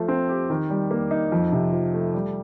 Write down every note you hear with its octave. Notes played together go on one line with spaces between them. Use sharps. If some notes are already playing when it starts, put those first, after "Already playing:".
Already playing: F3 A3
C4
G4
D#3
G3
A#3
D#4
F2
C3
F3
A3
G3